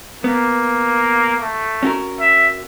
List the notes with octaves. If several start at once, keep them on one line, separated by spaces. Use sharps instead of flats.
A#3 B3
A3
C#4 F#4 A#4
E5